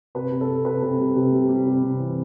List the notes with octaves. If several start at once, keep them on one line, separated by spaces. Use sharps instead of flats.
C3 B4
C3
A4
C3
C3 B4
C3
G3
C3
G3
G3
C3
C3
E3